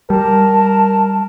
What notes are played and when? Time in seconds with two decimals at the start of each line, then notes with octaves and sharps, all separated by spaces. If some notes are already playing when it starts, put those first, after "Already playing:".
0.10 G3 A#4 A5